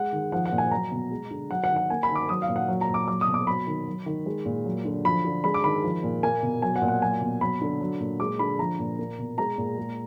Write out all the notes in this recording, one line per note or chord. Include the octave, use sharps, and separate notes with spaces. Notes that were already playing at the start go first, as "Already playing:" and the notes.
Already playing: G#3 F#5
D#3
F3 F#5
F#5
A#2
G#5
F#3 A#5
B2
G#3
D3
F#3 F#5
F#5
D#3
F#5
A#3 G#5
B5
D#3
D6
F#3 D#6
F5
A#2
F#5
F#3
A#5
A#2
D6
F#3 D6
D#6
B2
D6
F#3 B5
D#3
F#3
D#3
G#3
A#2
F#3
D3
F3 B5
D3
G#3 B5
D6
D#3 B5
F3
A#2
A#3 G#5
B2
F#3 G#5
F#5
A#2
F#5
F#3 G#5
B2
F#3 B5
D3
F#3
A#2
G#3 D6
D3 B5
F3 A#5
A#2
A#3
B2
G#3 A#5
A#2
G#3